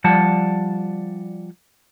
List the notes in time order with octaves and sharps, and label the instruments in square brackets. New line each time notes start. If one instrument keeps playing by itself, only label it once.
[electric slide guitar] F3 G3 D5 F#5 A5